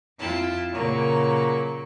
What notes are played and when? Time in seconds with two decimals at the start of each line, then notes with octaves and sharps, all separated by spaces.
0.20 F2 E4 F4 G5 A5
0.73 A#2 C#3 F#3 A#3 C#6